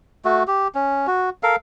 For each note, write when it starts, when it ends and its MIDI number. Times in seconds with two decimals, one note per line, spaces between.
0.25 0.43 57
0.25 0.43 66
0.48 0.68 67
0.75 1.07 61
1.07 1.30 66
1.43 1.56 69
1.43 1.56 70
1.43 1.56 77